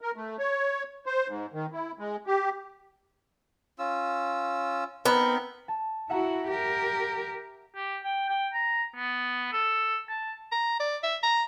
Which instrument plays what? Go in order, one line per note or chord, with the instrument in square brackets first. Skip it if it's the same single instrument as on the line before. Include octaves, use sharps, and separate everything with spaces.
[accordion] A#4
A3
C#5
C5
G#2
D#3
E4
G#3
G4
[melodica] C#4 F4 E6
[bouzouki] B3 [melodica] C4 D#4 A#4
[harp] A5
[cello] E4 F#4 [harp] E5 F#5 A#5
[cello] G4 A#4
[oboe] G4
G5
G5
A#5
B3
A4
A5
[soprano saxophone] A#5
D5
E5
A#5